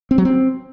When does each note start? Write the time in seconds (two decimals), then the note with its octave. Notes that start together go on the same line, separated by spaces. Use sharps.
0.11 C4
0.18 F#3
0.25 C4